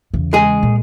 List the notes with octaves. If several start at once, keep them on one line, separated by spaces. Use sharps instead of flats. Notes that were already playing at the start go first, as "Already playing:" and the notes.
E2 C#3
G#3 G#4
A#2